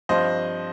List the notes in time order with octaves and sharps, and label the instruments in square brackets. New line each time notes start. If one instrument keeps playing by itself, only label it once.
[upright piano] G2 F3 C4 C5 D#5